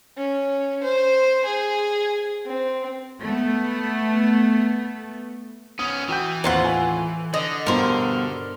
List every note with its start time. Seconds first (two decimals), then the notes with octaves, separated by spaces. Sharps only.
0.18 C#4
0.83 C5
1.45 G#4
2.46 C4
3.21 A3 B3
5.79 B3 C#4 D#6
6.09 E3 F#4 G5 G6
6.44 D#2 A2 C4 F4 F#5 A#5
6.65 G#5
7.34 D3 D#5
7.67 G2 B2 A#4 C5